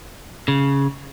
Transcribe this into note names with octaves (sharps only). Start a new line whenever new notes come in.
C#3